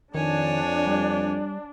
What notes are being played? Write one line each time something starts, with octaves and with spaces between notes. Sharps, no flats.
F2 D#3 D4 C#5 G#5
G3